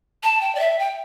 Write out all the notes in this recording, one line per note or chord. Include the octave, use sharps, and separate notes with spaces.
A5
G5
D5
E5
G5